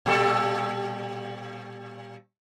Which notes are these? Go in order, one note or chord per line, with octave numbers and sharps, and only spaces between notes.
A#2 G3 A4